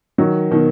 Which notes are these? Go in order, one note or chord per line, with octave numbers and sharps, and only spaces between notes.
D#3 F#3
B2 D#3